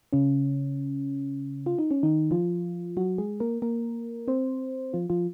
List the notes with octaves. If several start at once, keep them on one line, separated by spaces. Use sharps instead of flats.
C#3 C#4
F4
D#4
C#4
D#3 D#4
F3 F4
F#3 F#4
G#3 G#4
A#3 A#4
A#3 A#4
C4 C5
F3 F4
F3 F4